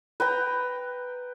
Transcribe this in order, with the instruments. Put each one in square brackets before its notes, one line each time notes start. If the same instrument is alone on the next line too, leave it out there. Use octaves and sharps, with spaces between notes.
[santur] B4 G5 A#5